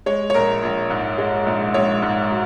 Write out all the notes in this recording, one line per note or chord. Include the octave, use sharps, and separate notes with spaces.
G#3 C#5
C#5
A#1 A#4
A#1
G#2
G#3
A#1
A#1 C#5
G#2
F#3